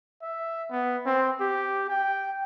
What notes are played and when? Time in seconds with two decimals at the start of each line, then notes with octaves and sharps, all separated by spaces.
0.22 E5
0.71 B3
1.06 C4
1.40 G4
1.90 G5